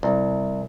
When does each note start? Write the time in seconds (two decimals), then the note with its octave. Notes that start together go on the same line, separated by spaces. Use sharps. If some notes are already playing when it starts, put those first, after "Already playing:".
0.03 C2